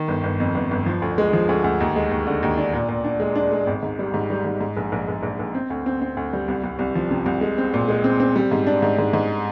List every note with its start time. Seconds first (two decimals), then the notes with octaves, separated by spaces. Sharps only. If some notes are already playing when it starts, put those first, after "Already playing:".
Already playing: D#3
0.08 G1
0.24 G1
0.40 F2
0.55 G1
0.71 G1
0.86 F3
1.02 D2
1.18 G#3
1.33 F3
1.49 D2
1.64 D2
1.80 D#2
1.96 G#3
2.11 D#2
2.27 D3
2.43 D#2
2.57 D4
2.74 A#2
2.89 A#2
3.04 D4
3.20 G#3
3.35 D4
3.52 G#3
3.67 G#1
3.83 G#2
3.99 G3
4.14 G#2
4.30 G3
4.45 G#2
4.61 G#2
4.77 A#1
4.92 A#1
5.08 A#1
5.23 A#1
5.39 A#1
5.55 C4
5.70 D2
5.86 C4
6.02 C4
6.17 D2
6.33 G3
6.48 C2
6.64 C2
6.79 C2
6.95 F3
7.11 C3
7.26 C2
7.41 G#3
7.58 C4
7.74 A#2
7.88 G#3
8.04 C4
8.20 C4
8.36 G3
8.51 G#2
8.67 D4
8.82 G#2
8.99 G#2
9.13 G#2